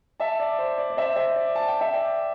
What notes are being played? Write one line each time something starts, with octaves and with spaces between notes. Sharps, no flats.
E5 A5
D5
C5
D5
D5
C5 E5
C5 E5
D5
A5
G5
E5
D5 G5